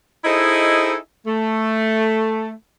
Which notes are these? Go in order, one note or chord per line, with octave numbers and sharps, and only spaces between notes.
D#4 E4 G#4 A4 C5 D#5
A3